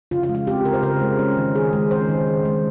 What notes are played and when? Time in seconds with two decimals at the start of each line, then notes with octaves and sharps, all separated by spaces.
0.11 C#3 F4
0.23 F4
0.29 G#3
0.35 F4
0.47 C4 G4
0.65 C#3 A#4
0.74 C5
0.83 C#3 A#4
1.01 G#3
1.19 C#4
1.37 D#3
1.55 D#3 G#4
1.73 G#3
1.91 C#4 C5
2.09 D#3
2.27 D#3
2.45 G#3